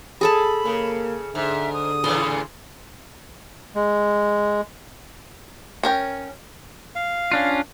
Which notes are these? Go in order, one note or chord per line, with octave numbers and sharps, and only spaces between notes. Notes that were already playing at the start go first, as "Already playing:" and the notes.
G#4 A4 A5 B5
C#3 A#3
G#2 D3 E5
D#6
A2 C#3 E3 C6
G#3
C#4 A#4 G5
F5
C#4 D4 F4